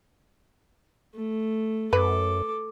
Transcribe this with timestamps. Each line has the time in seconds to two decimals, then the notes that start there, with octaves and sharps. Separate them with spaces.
1.15 A3
1.93 F#2 A4 B4 D6